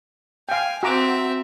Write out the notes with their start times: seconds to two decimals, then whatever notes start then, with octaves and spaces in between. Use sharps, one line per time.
0.49 F5 G5 G#5
0.83 C4 F#4 E5 A#5 D6